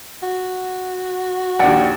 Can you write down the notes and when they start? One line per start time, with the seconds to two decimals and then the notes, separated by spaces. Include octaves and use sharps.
0.23 F#4
1.60 A#1 D#2 D5 F#5 G5